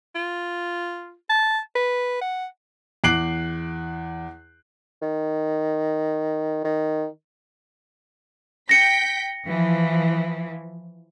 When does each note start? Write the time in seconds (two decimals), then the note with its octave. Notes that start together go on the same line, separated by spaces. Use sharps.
0.15 F4
1.29 A5
1.75 B4
2.21 F#5
3.04 E2 D6 F#6 C7 D7 F#7
5.02 D#3
6.64 D#3
8.69 G5 A#6 B6 C#7
9.45 E3 F3